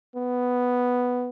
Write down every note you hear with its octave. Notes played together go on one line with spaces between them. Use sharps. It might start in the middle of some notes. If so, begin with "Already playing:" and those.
B3